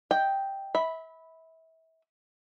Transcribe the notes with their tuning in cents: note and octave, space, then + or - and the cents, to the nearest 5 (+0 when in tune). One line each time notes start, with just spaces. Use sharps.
D#5 +25 G5 +0
E5 -30 B5 +0